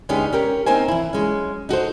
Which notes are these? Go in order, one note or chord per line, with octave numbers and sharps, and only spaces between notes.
D2 G#3 B3 C#4 D#4 G4
C#4 G4 A#4
A#3 C4 D#4 C5 G#5
E3 E4
F#3 G#3 C#4
D#4 F#4 A4 C5